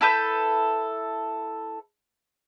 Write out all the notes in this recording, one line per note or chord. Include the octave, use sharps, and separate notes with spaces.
E4 A4 B4 G6